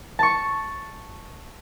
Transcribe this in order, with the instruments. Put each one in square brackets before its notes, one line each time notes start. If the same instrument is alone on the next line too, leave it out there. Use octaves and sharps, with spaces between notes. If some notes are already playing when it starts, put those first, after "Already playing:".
[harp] A5 C#6